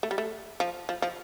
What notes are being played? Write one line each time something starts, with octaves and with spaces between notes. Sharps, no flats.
A3
G3
A3
F3
F3
F3